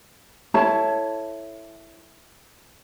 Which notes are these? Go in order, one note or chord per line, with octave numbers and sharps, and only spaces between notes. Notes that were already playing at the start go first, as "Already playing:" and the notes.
E4 A4 C#5 A5